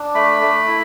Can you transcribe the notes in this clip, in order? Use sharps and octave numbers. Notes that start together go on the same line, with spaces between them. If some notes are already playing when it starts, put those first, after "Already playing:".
Already playing: D4
A3 B5
A3
E4